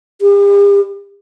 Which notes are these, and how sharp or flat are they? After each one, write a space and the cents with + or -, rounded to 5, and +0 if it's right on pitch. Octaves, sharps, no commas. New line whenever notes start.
G4 +45